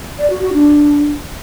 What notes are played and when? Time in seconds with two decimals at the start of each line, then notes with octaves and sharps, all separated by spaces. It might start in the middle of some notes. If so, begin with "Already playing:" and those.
0.18 D5
0.30 F#4
0.42 F#4
0.53 D4